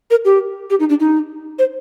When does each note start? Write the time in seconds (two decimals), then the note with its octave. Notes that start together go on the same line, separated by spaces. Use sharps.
0.11 A#4
0.25 G4
0.70 G4
0.80 D#4
0.89 D4
1.00 D#4
1.59 C5